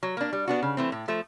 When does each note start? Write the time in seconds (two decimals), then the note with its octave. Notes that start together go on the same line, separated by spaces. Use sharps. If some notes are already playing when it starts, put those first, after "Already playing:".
0.03 F#3
0.17 A#3 D4
0.33 G3
0.47 B3 D4 F#4
0.62 C#3
0.77 E3 A3 C4
0.92 A2
1.08 F3 A3